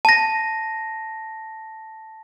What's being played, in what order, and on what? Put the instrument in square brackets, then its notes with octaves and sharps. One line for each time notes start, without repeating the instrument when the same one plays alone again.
[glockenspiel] A5 A#6